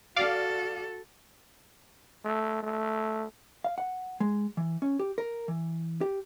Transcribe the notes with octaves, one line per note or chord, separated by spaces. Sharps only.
F#4 A4 D5 F5
A3
A3
F5
F#5
G#3
E3
C#4
G4
A#4
E3
G4